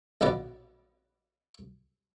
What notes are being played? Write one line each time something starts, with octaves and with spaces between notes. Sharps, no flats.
A#1 B2 B3 B4 D5